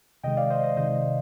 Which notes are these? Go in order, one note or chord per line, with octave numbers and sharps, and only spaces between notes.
C3 D#3 G#3 D#5 G5
D5 F5
C5 D#5
C5 D#5
C3 D#3 G#3 C5 D#5